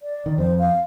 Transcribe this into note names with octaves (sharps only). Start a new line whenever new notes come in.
D5
D#3
F2 C5
F5